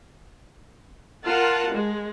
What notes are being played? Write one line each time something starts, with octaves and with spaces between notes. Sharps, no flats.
F4 A#4 F#5 A5
G#3